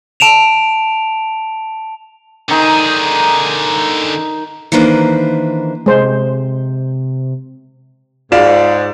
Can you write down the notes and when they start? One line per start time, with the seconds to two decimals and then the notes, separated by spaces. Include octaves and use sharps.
0.20 A5 D7 E7 F7
2.50 D3 D#3 D#4 G#4
4.72 D#3 E3 A#3 D4 B4 C5
5.86 C3 G#3 C5
8.32 G#2 D#4 F4 F#4 D5 F5 E7